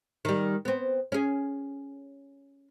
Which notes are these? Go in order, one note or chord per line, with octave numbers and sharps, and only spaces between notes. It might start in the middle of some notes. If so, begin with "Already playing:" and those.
D#3 G3
B3 C4
C#4 G#4